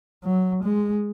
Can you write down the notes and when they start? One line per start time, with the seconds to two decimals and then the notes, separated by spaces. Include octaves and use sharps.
0.24 F#3
0.64 G#3